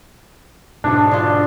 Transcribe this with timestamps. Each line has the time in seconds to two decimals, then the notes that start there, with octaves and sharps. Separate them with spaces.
0.84 G#2 B2 D4
1.11 D3 F4